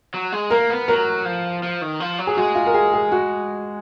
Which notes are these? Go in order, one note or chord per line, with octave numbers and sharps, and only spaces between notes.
F#3
G#3
A#3 A#4
B3
F#3 A#4
F3
F3
D#3
F3
F#3
G#4
G#3 F#4
F4
A#4
G#4
G#4
F#4